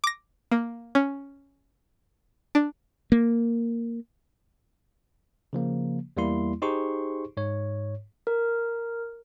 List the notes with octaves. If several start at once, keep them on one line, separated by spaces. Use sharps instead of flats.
D6 A#6
A#3
C#4
D4
A#3
C#3 F3 A#3
E2 G3 A#3 E4 C6
D#4 G4 G#4 C5 C6 C#6
G#2 C#5
A#4